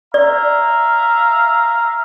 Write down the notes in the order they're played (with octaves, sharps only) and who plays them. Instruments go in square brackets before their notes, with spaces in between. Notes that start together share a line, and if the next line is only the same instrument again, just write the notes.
[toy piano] D5 [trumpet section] E5 F5 A#5